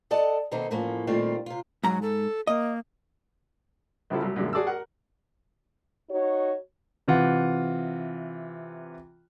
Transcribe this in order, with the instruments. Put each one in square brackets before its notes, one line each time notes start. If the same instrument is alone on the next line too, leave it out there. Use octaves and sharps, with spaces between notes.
[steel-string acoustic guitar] A4 D5 D#5 F#5 A5
B2 D#3 A#3 C4 D#4 A4
E2 A2 F3 A#3 C#4
A#2 D#3 G3 A3 C4 F4
C3 F4
[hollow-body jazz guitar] G#2 A#5 [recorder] F#3
[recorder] A4
[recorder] A#3 [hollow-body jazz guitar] D#5
[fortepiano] A#1 C#3 F3 E4 A4
C2 F#3
F#2 A#2 D3 G#3
F#4 G#4 D5 A5 E6
A#4 F#5
[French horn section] D#4 F#4 C#5
[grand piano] C3 E3 F4 F#5